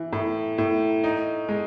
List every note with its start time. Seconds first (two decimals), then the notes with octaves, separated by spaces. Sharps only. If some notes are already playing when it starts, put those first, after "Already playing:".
Already playing: E3
0.13 A2
0.58 A2
1.04 D#4
1.49 G#3